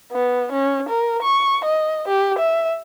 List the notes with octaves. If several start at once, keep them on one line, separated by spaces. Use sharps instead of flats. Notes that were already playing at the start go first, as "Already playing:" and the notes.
B3
C#4
A#4
C#6
D#5
G4
E5